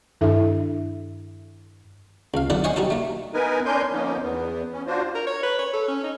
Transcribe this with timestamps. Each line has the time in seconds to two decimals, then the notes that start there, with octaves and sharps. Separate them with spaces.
0.21 G2 D#3 D4 E4 A4 E5
2.34 C#2 F5
2.50 B1 D3 B4 D5 F#5
2.64 C5 C#5 D#5 F#5 G#5 C6
2.76 G3 D#4 F#4 A4
2.90 A3 A#3
3.34 B3 D#4 A#4 B4 G#5
3.65 C#4 D4 A#4 G#5 C6 G6
3.92 D3 F3 A#3 B3 C#4 D#4
4.22 E2 B3
4.73 C#4
4.87 D4 F4 F#4 C5
5.15 A#4
5.27 C#5
5.43 B4
5.59 C#5
5.74 A4
5.88 C#4
6.04 D#4